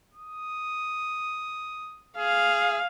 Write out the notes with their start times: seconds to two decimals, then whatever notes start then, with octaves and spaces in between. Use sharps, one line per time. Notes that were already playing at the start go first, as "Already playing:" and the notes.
0.14 D#6
2.18 G#4 F5